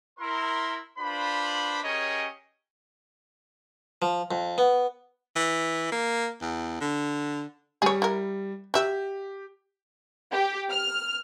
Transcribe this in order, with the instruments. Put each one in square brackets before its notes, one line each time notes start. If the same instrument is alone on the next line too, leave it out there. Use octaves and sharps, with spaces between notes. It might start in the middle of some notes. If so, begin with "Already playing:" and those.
[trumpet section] E4 A#4 C6
D4 F4 B4 C5 B5
C#4 G4 G#4 A#4 C#5 D#5
[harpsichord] F3
F2
B3
[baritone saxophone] E3
A#3
E2
D3
[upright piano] G3 [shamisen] G#4 C#5
[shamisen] E4 A#4
[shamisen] F#4 E5 [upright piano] G4
[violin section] G4
F6